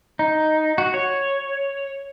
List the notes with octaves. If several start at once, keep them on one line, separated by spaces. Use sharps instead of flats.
D#4
F#4
C#5